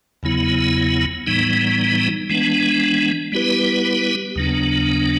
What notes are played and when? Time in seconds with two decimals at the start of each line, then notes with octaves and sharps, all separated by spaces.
0.23 E2 C#3 F#3 B3 E4
1.26 A2 E3 G3 B3 D#4
2.29 E3 G#3 B3 D4
3.32 G3 B3 E4 G4 B4
4.36 D#2 C#3 F#3 B3 D4